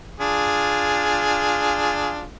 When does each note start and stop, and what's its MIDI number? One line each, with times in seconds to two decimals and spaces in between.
0.20 2.26 62
0.20 2.26 65
0.20 2.26 68